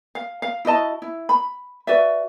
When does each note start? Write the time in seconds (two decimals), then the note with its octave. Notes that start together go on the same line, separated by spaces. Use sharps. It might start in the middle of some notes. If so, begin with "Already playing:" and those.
0.15 F5
0.42 F5
0.65 E4 F#4 D#5 A5
1.02 E4
1.29 B5
1.87 F#4 B4 D5 E5